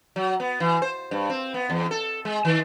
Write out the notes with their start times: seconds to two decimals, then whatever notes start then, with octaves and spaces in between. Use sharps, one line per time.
0.16 F#3
0.40 B3
0.60 E3
0.82 C5
1.11 G2
1.30 C4
1.54 B3
1.70 E2
1.91 A4
2.25 G#3
2.45 D#3